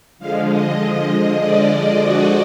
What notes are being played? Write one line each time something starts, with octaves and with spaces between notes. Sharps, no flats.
D3 F3 G#3 F5
D#5
D#5
D#5
D5
F#4